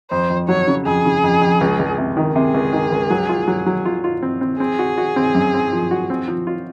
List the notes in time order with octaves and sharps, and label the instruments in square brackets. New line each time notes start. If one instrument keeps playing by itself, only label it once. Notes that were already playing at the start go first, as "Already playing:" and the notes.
[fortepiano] F2 [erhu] C5
[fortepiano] F2
[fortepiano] F#3 [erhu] C#5
[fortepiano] C#3
[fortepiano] F2 [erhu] G#4
[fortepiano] C#3
F2
F2
C#2
C#2
C3
D#3
[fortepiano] C3 [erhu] G#4
[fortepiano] C#2
D#3
C#2
F#3
F4
F#3
F#3
F4
F4
C4
C4
[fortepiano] C4 [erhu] G#4
[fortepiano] F#4
F#4
C4
F#2
C4
F3
F#4
C4
F3
F4